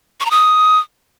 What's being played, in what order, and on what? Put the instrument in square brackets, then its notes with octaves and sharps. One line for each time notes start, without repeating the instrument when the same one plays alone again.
[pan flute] C#6
A#5
D#6